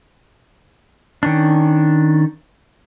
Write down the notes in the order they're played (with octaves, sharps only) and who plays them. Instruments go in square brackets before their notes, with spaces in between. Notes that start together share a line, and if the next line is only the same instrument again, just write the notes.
[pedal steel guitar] D#3 C#4 D4